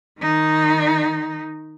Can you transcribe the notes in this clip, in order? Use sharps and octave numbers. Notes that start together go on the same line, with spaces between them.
D#3 D#4